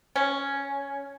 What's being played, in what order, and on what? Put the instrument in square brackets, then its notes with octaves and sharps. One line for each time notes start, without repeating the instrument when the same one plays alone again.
[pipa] C#4